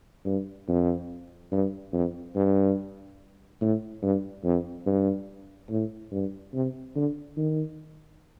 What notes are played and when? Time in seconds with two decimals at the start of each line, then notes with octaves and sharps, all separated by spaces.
0.25 G2
0.68 F2
1.52 G2
1.93 F2
2.35 G2
3.61 A2
4.02 G2
4.44 F2
4.86 G2
5.70 A2
6.12 G2
6.54 C3
6.96 D3
7.37 D#3